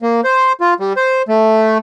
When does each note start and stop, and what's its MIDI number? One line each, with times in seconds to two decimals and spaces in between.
0.02 0.21 58
0.24 0.53 72
0.60 0.74 65
0.80 0.93 55
0.96 1.22 72
1.28 1.78 57